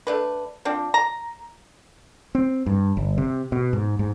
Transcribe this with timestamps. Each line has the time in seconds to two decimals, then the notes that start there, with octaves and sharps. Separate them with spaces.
0.07 A3 D4 B4
0.65 F3 C4 D4
0.94 A#5
2.35 C4
2.66 G2
2.97 G1
3.18 C3
3.52 B2
3.73 G#2
3.99 G#2